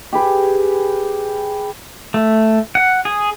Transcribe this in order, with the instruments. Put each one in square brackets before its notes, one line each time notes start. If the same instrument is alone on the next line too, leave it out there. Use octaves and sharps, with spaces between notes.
[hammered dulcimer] G4 G#4 B4
[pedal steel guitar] A3
F#5
G#4